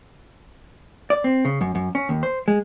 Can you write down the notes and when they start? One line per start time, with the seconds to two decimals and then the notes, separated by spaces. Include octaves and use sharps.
1.10 D5
1.24 C4
1.45 C#3
1.61 F#2
1.75 F#2
1.95 C#4
2.09 D#2
2.23 C5
2.48 G#3